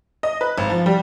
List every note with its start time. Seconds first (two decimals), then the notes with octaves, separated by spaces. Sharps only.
0.23 D#5
0.41 B4
0.58 G#1
0.70 F3
0.86 G3